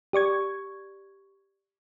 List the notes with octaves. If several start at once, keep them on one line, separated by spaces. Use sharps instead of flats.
G4 D5 C#6 G#6